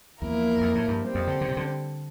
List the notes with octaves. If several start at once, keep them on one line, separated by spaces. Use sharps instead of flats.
E2 F3 A#3 E4 A#4
F2
A2
G2
G3 C4 G4
F2
D3
D3
C3
D3